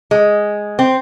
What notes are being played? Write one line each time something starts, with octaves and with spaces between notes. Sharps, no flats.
G#3
C4